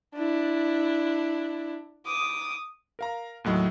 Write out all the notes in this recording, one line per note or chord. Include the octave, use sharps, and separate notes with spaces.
D4 E4
D6 D#6
A#4 F5 A#5
D#2 A2 F#3 D#5